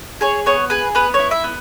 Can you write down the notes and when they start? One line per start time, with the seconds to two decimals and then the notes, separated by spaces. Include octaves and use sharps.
0.21 G#4 C#5
0.46 B3 C#5
0.70 G#4 B4
0.95 B3 B4
1.14 E4 C#5
1.31 E5
1.44 B3